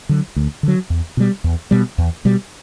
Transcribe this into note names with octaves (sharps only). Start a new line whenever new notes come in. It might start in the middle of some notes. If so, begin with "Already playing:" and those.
D3 F#3
D2
D3 F#3
E2
B2 G3
E2
B2 G3
E2
B2 G3